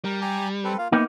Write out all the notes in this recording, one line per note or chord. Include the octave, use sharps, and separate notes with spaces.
G3 A#4
G4 G#5 A#5
C4 A4 B4
A#3 F4 F5
A#3 B3 D#4 E4